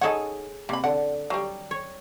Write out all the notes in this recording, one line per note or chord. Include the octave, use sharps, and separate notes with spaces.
D#4 G#4 A4 C#5 F#5
C3 A#3 B5
D3 F#5
F#3 G3
C#5